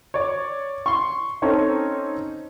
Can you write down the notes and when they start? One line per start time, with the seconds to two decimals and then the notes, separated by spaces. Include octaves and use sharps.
0.14 C#5 D5
0.86 C6 C#6
1.42 C4 C#4 D#4 A4 C#5